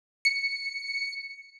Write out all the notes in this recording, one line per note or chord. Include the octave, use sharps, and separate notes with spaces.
C#7